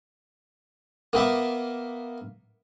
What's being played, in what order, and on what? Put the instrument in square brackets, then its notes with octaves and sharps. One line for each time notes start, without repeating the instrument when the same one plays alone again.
[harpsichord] A#3 B3 E5 D6